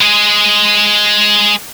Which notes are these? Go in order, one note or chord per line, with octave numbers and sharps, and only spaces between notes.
G#3 G#4